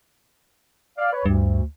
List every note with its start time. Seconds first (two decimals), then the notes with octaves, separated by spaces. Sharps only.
0.98 D5 F5
1.13 B4 C#5
1.26 D2 G2